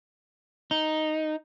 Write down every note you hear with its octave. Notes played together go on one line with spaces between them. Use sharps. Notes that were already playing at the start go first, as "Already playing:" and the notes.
D#4